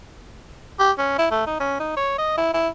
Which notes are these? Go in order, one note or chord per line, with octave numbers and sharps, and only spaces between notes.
G4
C#4
E4
A3
D#4
C#4
D#4
C#5
D#5
E4
E4